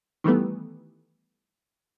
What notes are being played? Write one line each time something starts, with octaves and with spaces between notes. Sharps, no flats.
D#3 E3 G3 A3 B3